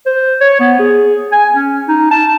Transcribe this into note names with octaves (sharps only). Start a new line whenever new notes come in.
C5
C#5
B3
G#4
G#5
C#4
D#4
A5